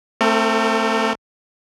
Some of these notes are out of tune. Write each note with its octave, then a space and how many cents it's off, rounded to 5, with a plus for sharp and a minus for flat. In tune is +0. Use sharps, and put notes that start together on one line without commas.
A3 +15 C4 +0 A#4 -45